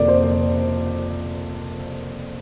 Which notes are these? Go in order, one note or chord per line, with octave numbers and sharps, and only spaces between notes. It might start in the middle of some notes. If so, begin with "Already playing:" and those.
Already playing: F2 C3 A#3 D5
C5